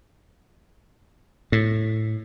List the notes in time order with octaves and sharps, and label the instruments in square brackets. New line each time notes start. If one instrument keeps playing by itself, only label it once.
[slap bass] A2